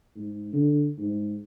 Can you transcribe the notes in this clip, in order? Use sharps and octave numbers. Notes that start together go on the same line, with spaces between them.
G#2
D3
G#2